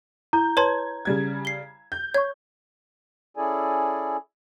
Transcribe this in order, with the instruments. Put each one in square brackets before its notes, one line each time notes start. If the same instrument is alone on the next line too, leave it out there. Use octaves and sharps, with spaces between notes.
[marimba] E4 [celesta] A#5 [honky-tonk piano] G6
[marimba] B4 [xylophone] C#5 A5 C6 [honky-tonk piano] G#6
[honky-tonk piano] C#3 G3 G#6
[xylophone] C7 G7
[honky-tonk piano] G6
[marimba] C#5 C#6 [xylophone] G#6
[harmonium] C#4 E4 G#4 A4 D5 G#5